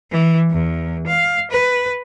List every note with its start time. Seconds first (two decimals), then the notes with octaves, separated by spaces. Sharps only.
0.11 E3
0.51 E2
1.07 F5
1.51 B4